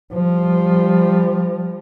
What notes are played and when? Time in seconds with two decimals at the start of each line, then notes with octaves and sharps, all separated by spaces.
0.13 F3 G3